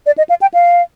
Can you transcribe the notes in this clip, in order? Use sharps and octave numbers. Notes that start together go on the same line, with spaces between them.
D5
D#5
F5
G5
F5